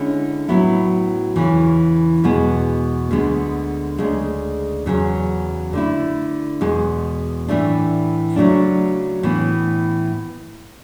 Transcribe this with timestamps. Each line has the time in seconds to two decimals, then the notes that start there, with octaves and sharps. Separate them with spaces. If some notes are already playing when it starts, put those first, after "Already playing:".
Already playing: D3 G#3 C#4 E4
0.48 A2 F#3 B3 E4
1.36 E2 C#3 E3
2.24 E2 B2 G#3 B3
3.11 D2 D3 G#3 B3
3.98 D2 C#3 G#3
4.86 E2 C#3 F#3
5.73 D3 A3 E4
6.61 E2 B2 G#3
7.48 A2 E3 A3 D4
8.36 C#3 F#3 A3 D4
9.23 A2 E3 B3